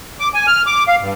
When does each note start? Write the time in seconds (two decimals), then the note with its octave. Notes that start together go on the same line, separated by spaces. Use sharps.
0.20 D6
0.34 G#5
0.47 F6
0.67 D6
0.88 F5
1.01 G2